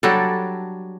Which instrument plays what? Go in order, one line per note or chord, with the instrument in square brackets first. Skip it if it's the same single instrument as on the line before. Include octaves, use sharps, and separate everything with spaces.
[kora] F#3 G3 D4 A4